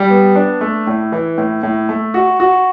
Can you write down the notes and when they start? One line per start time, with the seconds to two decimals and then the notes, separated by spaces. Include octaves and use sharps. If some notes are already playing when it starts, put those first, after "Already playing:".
Already playing: G3
0.10 B3
0.36 D4
0.61 A3
0.87 A2
1.12 E3
1.38 A2
1.63 A2
1.89 A3
2.14 F#4
2.40 F#4